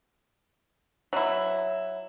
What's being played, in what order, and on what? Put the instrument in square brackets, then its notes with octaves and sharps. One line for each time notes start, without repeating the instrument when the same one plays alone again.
[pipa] F#3 E4